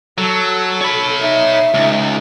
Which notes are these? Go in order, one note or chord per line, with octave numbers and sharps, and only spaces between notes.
F#3 A4
C#5 B5
D#4 E5
C#2 D#4